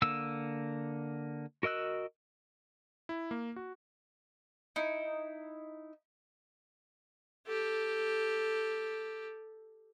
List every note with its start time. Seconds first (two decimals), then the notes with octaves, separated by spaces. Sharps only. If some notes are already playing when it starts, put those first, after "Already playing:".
0.02 D3 A#3 E6
1.63 F#4 A#4 D#5 E6 F#6
3.09 E4
3.31 A#3
3.56 F#4
4.76 D#4 E4
7.46 G4 A4